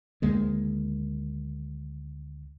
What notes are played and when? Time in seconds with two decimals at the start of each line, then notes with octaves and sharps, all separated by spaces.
0.22 D2 D#3 G#3 A#3